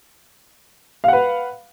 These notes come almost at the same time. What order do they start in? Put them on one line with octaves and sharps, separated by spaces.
F5 F#5 B4